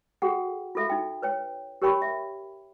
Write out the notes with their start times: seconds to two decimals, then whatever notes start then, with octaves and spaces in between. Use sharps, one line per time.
0.22 F#4 G#4 A4 F#5 G5
0.75 F4 F#4 A4 E5 F5
0.90 D#4 G5
1.22 B4 C#5 G5
1.82 G4 A#4 C#5 G5 B5 C#6
2.02 E5